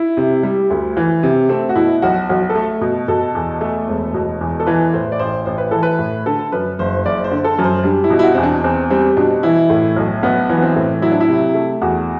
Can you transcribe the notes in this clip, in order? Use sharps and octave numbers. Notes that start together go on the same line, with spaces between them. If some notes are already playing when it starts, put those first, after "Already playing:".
Already playing: E4
C3
G3
D2
E3
C3
A3 C4
F#4
B2 E4
B1 F#4
B1 F#4
A4
A3
B2
B2 A4
E2
A3
E1
B2
E2
A4
E3 B4
A2 C5
D5
A1 C5
A1 C5
B4
E3 A4
B4
A2
D3 A4
F#2 B4
F#1 C5
F#1 D5
C5
D3
A4
F#2
C5
G3 D4
E4
B2
E4
F#4
E2 C4
D4
E2 C4
G3 C4
B2 D4
E3 E4
A2
B1
B1 B3
E3
B3
C4
A2
F#3 E4
D4
E4
C3
A3
E2 F#4